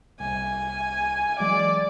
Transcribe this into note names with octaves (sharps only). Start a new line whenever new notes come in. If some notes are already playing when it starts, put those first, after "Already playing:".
C2 G#5
E3 F#3 G#3 D5